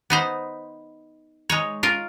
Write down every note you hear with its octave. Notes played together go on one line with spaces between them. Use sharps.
B3 D#4 C5
G#3 D#4 C#5
F4 A#4